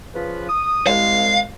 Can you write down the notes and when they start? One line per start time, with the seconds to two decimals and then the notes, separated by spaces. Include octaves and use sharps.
0.14 C#3 F3 B4
0.49 D#6
0.87 C2 G#3 F5